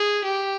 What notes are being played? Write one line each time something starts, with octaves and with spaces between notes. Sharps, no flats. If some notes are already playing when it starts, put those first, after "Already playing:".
Already playing: G#4
G4